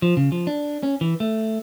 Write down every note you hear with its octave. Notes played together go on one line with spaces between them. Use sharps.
F3
C#3
F3
D4
C#4
E3
A3